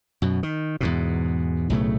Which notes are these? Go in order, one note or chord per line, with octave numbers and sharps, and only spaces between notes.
F#2 B2
D#3
E2 G#2 B2
B1 A2 C#3 A3